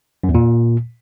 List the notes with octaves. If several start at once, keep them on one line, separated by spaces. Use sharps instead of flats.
F#2
E2
A#2